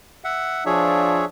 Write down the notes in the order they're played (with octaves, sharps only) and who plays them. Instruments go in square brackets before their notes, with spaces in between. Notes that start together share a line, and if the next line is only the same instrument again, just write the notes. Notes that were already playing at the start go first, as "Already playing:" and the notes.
[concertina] E5 F#5
[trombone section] F3 D4 [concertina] G#4 C#5 E5